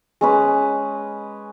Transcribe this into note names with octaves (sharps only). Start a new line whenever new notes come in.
G#3 C#4 B4